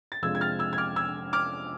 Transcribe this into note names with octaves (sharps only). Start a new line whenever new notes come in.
A6
F2 C3 G#3 D4 F4 E6 G#6
G#6
F6 A6
E6 G#6
G#6
D6 F6
E6 G#6
D6 F6